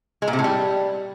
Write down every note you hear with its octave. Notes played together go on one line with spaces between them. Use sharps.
G#3
A#2
C3
A2
G3